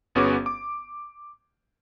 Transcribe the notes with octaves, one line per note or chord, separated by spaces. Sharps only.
G1 B3 C#4 F#4 G#4 D6
D6